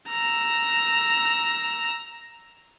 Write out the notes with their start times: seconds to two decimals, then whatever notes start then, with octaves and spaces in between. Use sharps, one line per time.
0.10 A#5 E6